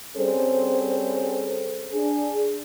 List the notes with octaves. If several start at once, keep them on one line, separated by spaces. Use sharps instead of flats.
G3 C4 C#4 G#4 A4 C5
D4 G#4